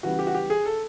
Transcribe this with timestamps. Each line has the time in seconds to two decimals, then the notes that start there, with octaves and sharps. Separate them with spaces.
0.03 C#3 E3 G3 B3 F#4
0.19 G4
0.27 F#4
0.34 G4
0.50 G#4
0.66 A4